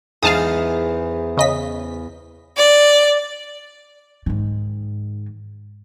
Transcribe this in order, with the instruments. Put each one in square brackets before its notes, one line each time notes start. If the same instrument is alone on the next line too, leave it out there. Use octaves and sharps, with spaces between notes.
[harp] E2 [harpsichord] G#2 D#4 [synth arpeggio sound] F5 A5 D#6
[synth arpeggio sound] C#3 D#5 B6
[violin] D5
[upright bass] G#2 D#3